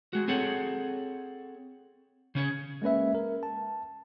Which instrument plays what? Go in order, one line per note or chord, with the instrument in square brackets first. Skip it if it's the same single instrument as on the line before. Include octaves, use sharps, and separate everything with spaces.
[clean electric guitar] G#3 F#4
C4 G#4 A4 C#5 F#5
C#3 C#4 C#5
[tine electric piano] G#3 A#3 C#4 B4 E5
A#4
A5